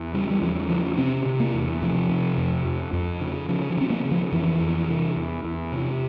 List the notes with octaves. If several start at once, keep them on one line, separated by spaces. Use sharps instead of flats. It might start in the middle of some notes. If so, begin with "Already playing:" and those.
Already playing: E2
C#3 G3
G3
E2 F3
C#3 F3
C3 C4
C3
A#3
E2
C3 F3
C3
F2
F2
F2
C#3
C#3 F3
F3
C#3 C4
A#3
C#3
F3
F2 E3
F2
C3
E2
E2
C3